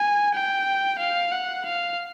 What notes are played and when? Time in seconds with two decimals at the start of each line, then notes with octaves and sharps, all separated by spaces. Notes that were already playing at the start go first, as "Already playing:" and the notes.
Already playing: G#5
0.34 G5
0.99 F5
1.32 F#5
1.66 F5